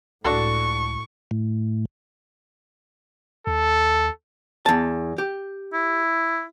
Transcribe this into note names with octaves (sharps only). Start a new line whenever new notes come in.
C#2 A2 D4 F#4 A4 C#6
A2
D#2 A4
E2 A5
G4
E4